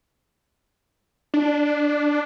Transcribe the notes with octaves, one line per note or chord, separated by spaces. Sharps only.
D4